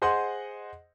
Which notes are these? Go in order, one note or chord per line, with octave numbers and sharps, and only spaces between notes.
G#4 C5 D#5 F#5 C6